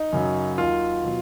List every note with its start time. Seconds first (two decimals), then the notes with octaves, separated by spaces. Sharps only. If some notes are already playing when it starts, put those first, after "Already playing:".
Already playing: D#4
0.13 F#2 C#3 F#3
0.58 D#2 D#3 F#3 F4
1.04 B2 F#3